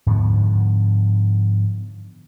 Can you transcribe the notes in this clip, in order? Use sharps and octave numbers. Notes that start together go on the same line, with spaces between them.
G#2 D3 F3 B3